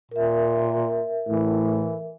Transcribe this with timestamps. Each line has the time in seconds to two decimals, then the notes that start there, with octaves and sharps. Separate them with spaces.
0.11 A#2 A#4 E5
1.28 A2 E3